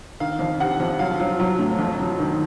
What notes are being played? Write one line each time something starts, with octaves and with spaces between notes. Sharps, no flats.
D#3 F5
F2
C3 F#5
F2
F#3 F5
F#3
F#3
A2
F2
F#3
D#3